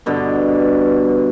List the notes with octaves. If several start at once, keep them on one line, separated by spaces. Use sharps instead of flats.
G2 B2 D3 B3